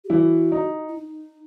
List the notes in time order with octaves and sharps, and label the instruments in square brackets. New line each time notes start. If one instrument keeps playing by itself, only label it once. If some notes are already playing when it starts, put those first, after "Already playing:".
[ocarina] G4
[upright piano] E3 E4 [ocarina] F#4
[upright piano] D#4
[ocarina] E4
D#4